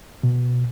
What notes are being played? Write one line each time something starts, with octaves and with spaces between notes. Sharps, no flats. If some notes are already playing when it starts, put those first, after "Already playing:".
B2